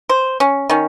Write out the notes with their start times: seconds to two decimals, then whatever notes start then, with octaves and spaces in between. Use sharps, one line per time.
0.09 C5
0.40 C#4
0.69 D#3 C#4